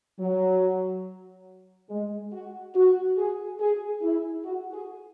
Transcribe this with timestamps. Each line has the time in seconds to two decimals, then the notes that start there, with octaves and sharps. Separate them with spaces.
0.20 F#3
1.90 G#3
2.33 F#4
2.75 F#4
3.17 G#4
3.60 G#4
4.02 E4
4.45 F#4
4.73 G#4